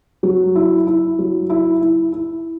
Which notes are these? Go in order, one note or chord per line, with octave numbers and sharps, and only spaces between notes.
F#3
E4
E4
F#3
E4
E4
E4